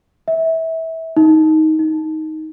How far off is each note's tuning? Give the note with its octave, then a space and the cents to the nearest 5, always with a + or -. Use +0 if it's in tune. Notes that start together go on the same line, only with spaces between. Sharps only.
E5 -25
D#4 +15
D#4 +10